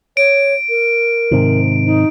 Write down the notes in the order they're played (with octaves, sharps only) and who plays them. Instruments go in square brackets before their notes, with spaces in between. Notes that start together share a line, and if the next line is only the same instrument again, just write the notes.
[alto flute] C#5 [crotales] D7
[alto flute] A#4
[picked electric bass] G#2 C3 D#3
[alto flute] D#4